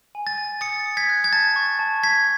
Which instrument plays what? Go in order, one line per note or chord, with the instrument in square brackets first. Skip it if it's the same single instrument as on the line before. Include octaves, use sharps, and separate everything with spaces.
[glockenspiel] G#5
A6
G#5
D#6 A6 C#7
D#6
G#6 B6
F#6
G#6
A5 A6
C#6
A5
A5 G#6 B6